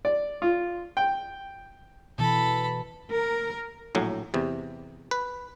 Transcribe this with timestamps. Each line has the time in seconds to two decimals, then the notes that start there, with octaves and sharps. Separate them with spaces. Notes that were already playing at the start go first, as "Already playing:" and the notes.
0.05 D5
0.42 F4
0.97 G5
2.19 B2 E3 A4 B5
3.12 A#4
3.95 A#1 A2 F#3
4.34 E2 C3
5.11 B4